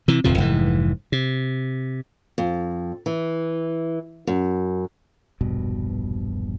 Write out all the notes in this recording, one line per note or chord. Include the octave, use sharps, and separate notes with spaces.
C3 E3
D1 F2 C3 F3
F1 G#2 E3
C3
F2
E3
F#2
E1 A#1 G2 B2